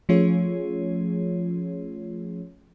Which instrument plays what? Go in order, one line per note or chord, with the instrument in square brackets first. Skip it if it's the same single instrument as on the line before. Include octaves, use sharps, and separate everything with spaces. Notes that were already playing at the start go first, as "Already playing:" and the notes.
[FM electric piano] F3 A3 C#4 F4 G#4 C#5